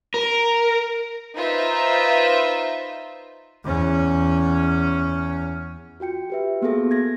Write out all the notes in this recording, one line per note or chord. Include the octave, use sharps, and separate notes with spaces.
A#4
D#4 F4 B4 C5 E5
E2 C#4
F4 F#4 G5 C#7
G4 B4 E5
A#3 B3 F#4 G#4 A4
G#6 A#6